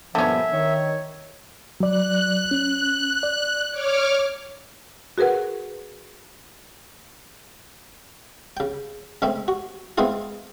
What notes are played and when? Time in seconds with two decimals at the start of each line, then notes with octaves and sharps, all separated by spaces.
0.15 G2 A#2 D3 F3 B3 C#4 E5
0.53 D#3 C#5
1.80 F#3 D5 F#6
2.51 C#4
3.23 D5
3.70 C#5 D6 F6
5.18 F#4 G#4 A#4 B4 F#5
8.57 C#3 G5
9.22 C#3 G#3 A3 C4
9.48 F#4
9.98 G#3 B3 C4 E4 F4 G#4